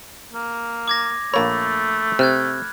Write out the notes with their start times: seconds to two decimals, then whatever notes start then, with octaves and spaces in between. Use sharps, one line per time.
0.34 A#3
0.88 D6 G#6 A#6
1.34 A#1 A3 A#3 C#5 B5 A6
2.19 C3 F6 F#6 G#6